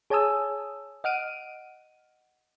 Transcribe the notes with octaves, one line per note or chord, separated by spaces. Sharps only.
G#4 C#5 G#5 A5 D#6 E6
D#5 F#5 F6 D7 D#7